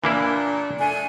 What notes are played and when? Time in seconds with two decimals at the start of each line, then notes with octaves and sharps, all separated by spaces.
0.04 A#2 E3 A#3 D4 E4
0.80 A3 D4 G#5